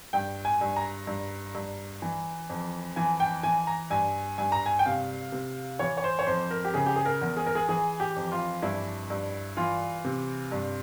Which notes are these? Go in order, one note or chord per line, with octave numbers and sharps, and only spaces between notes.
G2 G5
G#5
G2
A#5
G2
G2
E3
F2
E3 G#5
G5
E3 G#5
A#5
G2 G#5
G2 G#5
A#5
G#5
G5
C3 F5
C3
E3 C#5
C#5
C5
C#5
F2 C5
A#4
G4
C#3 G#4
G4
G#4
A#4
E2
G#4
A#4
G#4
E3 G#4
G4
F2
F4
G2 E4
G2
E3 F4
C3
G2